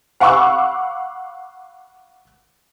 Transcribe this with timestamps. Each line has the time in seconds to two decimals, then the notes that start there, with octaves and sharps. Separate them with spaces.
0.20 F5 F#5 B5 C#6 D6 E6